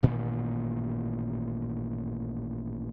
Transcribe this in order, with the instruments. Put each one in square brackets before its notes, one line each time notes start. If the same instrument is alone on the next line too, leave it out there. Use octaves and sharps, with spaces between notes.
[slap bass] A1 G2 A#2 D#3